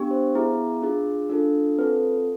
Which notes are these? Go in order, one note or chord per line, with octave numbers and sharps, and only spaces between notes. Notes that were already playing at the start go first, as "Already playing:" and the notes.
Already playing: B3 D4 G4
C5
B3 E4 G#4
D4 F4 G#4
D4 F4 A4
C4 F4 A4 B4